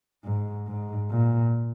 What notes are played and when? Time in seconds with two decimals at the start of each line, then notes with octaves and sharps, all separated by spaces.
0.25 G#2
0.67 G#2
1.10 A#2